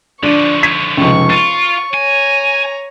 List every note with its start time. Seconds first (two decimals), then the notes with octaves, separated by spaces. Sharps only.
0.23 D3 F3 D4 C#6
0.63 G#6 B6 D#7
0.97 F1 C#2 C#6
1.30 F4 A6 D#7
1.94 C#5 G#5 A#5